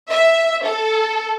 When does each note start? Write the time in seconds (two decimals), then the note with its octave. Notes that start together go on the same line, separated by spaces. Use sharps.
0.10 E5
0.64 A4